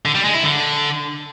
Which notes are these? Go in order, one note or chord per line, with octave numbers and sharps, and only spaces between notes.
D3
G3
G#3
E4
D3